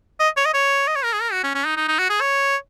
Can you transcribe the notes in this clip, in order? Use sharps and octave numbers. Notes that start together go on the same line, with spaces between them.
D#5
C#5
D#5
C#5
D#5
C#5
A#4
G#4
A#4
F#4
C#4
C#4
D#4
D#4
D#4
F#4
G#4
C#5